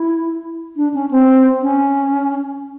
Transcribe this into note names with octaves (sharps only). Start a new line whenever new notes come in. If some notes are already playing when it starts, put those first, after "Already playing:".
Already playing: E4
D4
C#4
C4
C#4